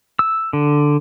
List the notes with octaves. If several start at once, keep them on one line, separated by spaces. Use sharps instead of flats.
E6
D3